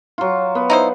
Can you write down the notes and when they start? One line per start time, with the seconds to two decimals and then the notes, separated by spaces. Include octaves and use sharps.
0.18 F#3 F4
0.55 B3
0.70 D#4 E4 C5